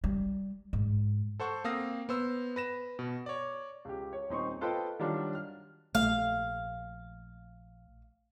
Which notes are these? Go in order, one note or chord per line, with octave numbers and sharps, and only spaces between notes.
G3
G#2
A4 C5 F#5 C#6
A#3 C4 F5 D#6 E6 A#6
B3 C5 E6
B4 A#6 E7
B2
C#5 D5
C#2 G4
C#5
D#1 C4 D#4 C6 C#6
F4 A4 B4 C5 D#5 G5
D#3 F#3 G3 D4 F4
F6
A#1 A3 F5